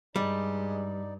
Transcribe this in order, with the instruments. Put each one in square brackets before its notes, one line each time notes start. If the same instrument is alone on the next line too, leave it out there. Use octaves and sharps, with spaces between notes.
[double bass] G2 [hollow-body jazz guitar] G3 [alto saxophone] G#3 [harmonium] D#4 D5